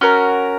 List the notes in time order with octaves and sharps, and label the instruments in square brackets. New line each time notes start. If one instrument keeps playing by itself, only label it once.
[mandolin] C#4 F#4 A#4